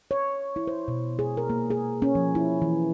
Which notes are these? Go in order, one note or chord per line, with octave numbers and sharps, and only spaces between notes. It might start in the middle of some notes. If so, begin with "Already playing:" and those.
C#5
E4
C5
B2
G#4
A#4
A#3
G#4
C#4
F3
E4
E3